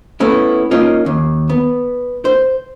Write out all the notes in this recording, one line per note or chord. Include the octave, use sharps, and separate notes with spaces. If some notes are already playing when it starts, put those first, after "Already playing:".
A3 B3 C#4 E4
A#3 C#4 D#4 F4
D#2
B3
C5